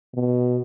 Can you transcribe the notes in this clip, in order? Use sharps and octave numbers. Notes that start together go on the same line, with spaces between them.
B2